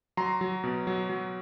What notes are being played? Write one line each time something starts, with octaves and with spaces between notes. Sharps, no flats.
F#3 A#5 C6
F#3
B2
F#3
F#3